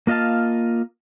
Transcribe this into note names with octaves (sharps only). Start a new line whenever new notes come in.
A#3 F4 D#5 F5 A5